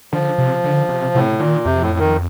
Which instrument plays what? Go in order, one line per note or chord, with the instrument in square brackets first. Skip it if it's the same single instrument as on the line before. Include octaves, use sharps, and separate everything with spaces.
[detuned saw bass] D3 [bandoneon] F3
[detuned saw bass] C3
D3
C3
[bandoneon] A2 [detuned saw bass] C3
[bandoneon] A#2 [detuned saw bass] D#3
[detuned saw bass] F2 [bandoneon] C3
[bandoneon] A2
D#3